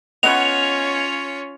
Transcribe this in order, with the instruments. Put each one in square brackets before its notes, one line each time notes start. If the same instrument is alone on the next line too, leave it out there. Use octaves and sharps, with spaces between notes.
[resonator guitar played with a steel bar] B3 D#5 F#5 [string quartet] C#4 F4 C#5 [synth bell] F7